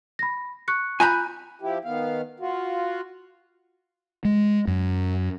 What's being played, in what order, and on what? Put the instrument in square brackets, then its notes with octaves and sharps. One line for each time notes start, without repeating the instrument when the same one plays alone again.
[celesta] B5 A#6
C#6 F#6 C#7
[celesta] F4 F#6 G6 [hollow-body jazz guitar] G#5 A#5 B5
[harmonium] F3 E4 G4
D#3 B3 F5
F4 F#4
[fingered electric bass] G#3
F#2